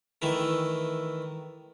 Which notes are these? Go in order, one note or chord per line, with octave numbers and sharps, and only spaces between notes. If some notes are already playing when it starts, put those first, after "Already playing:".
D#3 E3 A3